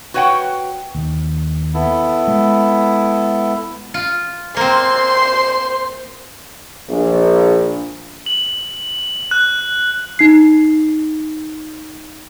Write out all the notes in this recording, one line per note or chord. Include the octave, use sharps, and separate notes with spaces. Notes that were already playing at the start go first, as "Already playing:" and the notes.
F#4 B4 C#5 F#5 G5
D#2
B3 E4 A4
G#3
F4
A#3 C4 C5 C6
A#1
F#7
F#6
D#4 C7